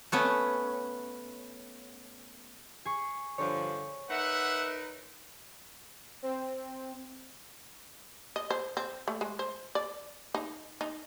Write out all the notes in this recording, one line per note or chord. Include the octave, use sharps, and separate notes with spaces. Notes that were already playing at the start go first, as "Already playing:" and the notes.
A3 B3 C#4
G#4 C#6
G2 D3 F3 C#5
D#4 A#4 B4 E5 F#5
C4
D#5
C5
C4
A3
G#3
C5
D5
D#4
D#4